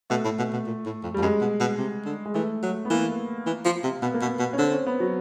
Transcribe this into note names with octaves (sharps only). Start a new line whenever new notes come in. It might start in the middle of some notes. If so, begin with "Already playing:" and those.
B2 A3
A2
B2
B2
A#2
A2
F2
F2 G3
F#2 G#3
B2
B2
C3
D3
G#3
E3 A3
F#3
B3
E3 A#3
E3
F3
C3
B2 B3
A#3
B2
B3
B2
C#4
D3 C4
C#4
B3
F#3